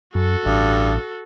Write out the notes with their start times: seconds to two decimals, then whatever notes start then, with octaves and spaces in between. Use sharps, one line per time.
0.15 F#2 F#4 A4
0.46 A1 G2